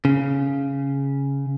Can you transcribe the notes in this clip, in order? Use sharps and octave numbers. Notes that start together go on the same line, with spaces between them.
C#3